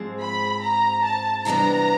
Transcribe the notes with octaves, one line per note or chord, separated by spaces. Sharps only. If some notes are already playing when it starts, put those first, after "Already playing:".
Already playing: G#2 F3 G#3 C4
B5
A#5
A5
C3 E3 G3 B3 D4 A#5